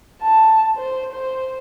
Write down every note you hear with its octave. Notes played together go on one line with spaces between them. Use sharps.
A5
C5
C5